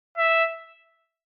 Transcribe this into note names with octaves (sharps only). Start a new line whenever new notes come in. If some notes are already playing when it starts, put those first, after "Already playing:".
E5